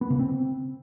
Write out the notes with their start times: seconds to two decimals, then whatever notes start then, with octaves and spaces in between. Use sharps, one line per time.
0.01 B3
0.10 C#3
0.19 C4